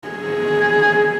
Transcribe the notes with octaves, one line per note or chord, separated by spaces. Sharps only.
G#4